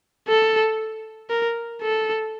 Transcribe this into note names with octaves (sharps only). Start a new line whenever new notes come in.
A4
A#4
A4